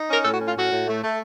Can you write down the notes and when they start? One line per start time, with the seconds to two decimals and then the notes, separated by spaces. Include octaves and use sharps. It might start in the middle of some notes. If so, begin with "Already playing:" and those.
Already playing: D#4
0.09 C#4 A#4
0.22 A4
0.26 A2
0.33 F#4
0.41 C#4 F4
0.56 A2 F#4
0.71 A2
0.87 A3
1.03 A3